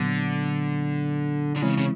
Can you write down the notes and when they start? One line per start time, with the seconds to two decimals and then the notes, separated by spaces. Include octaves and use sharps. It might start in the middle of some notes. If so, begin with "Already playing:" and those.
Already playing: A#2 D3 F#3 B3
1.56 D3
1.62 C#3 E3 G#3 C4 E4
1.78 C#3